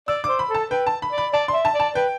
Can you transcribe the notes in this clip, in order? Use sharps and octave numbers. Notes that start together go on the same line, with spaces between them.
D5 E6
C5 D6
B5
A4 A5
B4 G5
A5
B5
D5
B5
D5 A5
C6
E5
A5
D5
A5
B4 G5